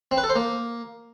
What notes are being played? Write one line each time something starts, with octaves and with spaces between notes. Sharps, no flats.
C4
B4
A4
C5
A#3